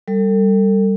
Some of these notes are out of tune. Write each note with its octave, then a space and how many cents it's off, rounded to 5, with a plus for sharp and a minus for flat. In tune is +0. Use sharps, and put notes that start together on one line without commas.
G3 +0 A4 +35